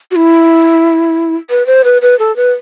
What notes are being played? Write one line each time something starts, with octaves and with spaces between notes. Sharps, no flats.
F#4
E4
B4
C5
B4
B4
A4
B4